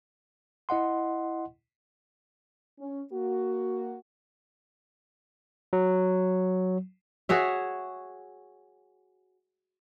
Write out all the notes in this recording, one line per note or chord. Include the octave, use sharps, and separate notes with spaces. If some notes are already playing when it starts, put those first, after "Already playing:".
E4 D#5 F#5 C6
C#4
A#3 F#4
F#3
F#4 G#4 C#5 E5